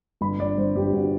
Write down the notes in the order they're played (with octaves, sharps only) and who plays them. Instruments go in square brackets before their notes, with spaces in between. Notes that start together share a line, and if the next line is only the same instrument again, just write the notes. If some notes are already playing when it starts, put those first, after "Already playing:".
[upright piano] G1 B5
G1 D5
G1 C5
G1 G4
G1 F#4